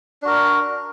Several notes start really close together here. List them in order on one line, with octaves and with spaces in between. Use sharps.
D4 F#4 A#4